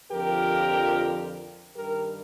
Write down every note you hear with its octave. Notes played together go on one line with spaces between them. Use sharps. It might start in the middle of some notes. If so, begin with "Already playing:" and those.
F2 D3 F3 G4 A#4
G2 D#3 G3 G4 A#4